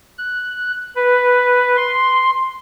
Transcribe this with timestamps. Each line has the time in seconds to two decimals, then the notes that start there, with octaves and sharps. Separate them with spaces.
0.18 F#6
0.96 B4
1.77 C6